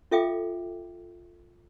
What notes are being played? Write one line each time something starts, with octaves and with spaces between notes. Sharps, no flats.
F4 A4 E5 F5 G5 D6